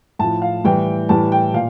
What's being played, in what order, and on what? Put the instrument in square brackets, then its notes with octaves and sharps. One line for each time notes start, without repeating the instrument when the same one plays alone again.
[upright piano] A2 F3 A5
F5
A2 E3 G3 G5
A2 E3 G3 A5
G5
A#2 F5